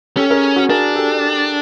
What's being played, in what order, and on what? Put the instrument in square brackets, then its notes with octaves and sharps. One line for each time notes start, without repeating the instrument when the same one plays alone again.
[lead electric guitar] C#4 [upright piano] G4 A4
[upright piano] G#4 A#4
F#4 G#4
[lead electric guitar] D4 [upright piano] G#4 A#4
[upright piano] G4 A4